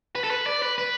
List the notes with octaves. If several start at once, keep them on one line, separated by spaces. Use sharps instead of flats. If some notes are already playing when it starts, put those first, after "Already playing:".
B4
A4
B4
D5
B4
B4